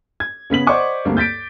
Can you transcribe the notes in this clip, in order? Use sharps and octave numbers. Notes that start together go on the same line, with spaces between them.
G#6
C#3 B3 B6 F#7
C5 D5 D#5 F#5 C#6 D6
D2 G2 A#3 C4
G6 A6 B6 D7